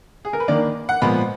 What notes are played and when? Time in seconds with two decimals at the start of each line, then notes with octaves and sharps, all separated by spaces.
0.25 G#4
0.33 A#4
0.40 B4
0.48 D#3 A#3 D4 D5
0.89 F#5
1.02 A#2 F3 G#3 B3 B5